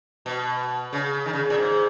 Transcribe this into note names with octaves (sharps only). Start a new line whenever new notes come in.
B2
C#3
D#3
C#3
A#2
G#2